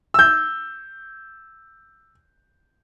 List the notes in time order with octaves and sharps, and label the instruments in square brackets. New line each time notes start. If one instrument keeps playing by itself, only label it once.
[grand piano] E6 G6